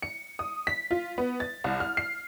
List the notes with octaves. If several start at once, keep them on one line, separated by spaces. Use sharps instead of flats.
C#7
D#6
B6
F4
B3
A6
C2
F6
C7